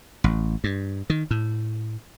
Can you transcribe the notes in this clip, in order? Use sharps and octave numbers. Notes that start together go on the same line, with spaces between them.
A1
G2
D#3
A2